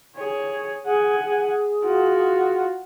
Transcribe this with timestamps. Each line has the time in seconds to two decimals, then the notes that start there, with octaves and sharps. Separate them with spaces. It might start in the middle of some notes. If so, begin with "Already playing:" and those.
0.15 G#4 C#5
0.85 G#4 F#5 G#5
1.25 G#4
1.84 F4 F#4